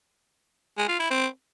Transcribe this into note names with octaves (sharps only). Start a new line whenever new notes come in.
G#3
F4
E4
C4